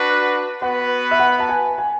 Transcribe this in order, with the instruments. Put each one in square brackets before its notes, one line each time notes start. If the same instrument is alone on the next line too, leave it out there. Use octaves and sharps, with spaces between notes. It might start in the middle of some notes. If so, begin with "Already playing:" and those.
Already playing: [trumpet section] D4 F#4 B4
[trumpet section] B3 F#4 B4 [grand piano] F#5
[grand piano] E5
F#5
A5
G#5
G#5